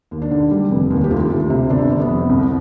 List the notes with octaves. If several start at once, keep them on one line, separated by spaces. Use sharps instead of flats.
D#2
D4
D3
G3
F1
D#2
G4
D2 F4
D2
C3
G1 D4
G1
B3
F2
C2